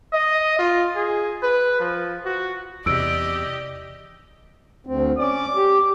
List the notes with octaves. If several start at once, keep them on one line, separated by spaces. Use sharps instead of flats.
D#5
F4
G#4
B4
F3
F#4
E2 C3 G4 D5 D#5 E6 D7
D2 C4
C#4 D5 D6
G4